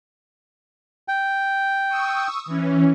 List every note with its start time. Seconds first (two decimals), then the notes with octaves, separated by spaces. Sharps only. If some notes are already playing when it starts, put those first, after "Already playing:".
1.08 G5
1.89 C#6 D#6 E6
2.46 E3 C#4